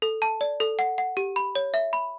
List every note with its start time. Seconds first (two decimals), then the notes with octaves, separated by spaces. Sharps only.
0.02 A4
0.22 A5
0.41 D5
0.60 A4
0.79 F#5
0.98 F#5
1.17 G4
1.36 B5
1.55 C#5
1.74 E5
1.93 B5